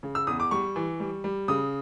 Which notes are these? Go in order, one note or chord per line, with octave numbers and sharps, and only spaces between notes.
C#3
E6
E2 D#6
D6
G3 C#6
E3
G3
G3
C#3 D#6